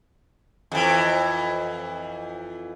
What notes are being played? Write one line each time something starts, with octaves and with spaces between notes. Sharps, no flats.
F2 E3